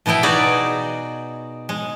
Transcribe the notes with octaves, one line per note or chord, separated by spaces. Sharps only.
B2 E3 B3 E4 G5
D#4 F#4 G#4 D5
G#3